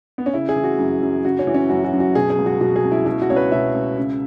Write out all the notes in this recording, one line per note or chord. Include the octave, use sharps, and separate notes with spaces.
B3
C#4
C#3 E4
G#4
E3
F#4
F#2
F#2
C#3 F#4
C#4
E3
C#4
F#2 F#4
F#4
F#2
F#4
B2 G#4
G#4
C#2
F#4
B2 F#4
G#4
C#2
E4
B2 E4
F#4
C#2 C#5
B4
B2 E5
C#2
C#3